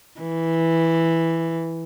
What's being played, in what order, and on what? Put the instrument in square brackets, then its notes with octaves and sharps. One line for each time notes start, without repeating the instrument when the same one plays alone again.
[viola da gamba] E3